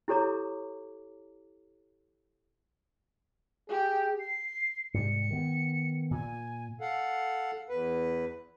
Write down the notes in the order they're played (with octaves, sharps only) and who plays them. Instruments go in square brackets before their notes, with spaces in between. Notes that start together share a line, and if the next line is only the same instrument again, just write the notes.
[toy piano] E4 G4 A4 C#5 A#5 D6
[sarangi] G4 [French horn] G#4
[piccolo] C7
[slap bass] G#2 C3 G3 [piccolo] C#7
[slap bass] D#3 B3
[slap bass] A#2 [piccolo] G#5
[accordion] A4 F5 F#5
E2 B4